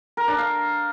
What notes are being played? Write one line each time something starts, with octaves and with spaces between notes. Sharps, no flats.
A#4
D4
F5